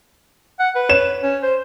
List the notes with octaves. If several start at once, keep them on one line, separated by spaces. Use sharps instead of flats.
F#5
B4
C#5 E7
C#4
C5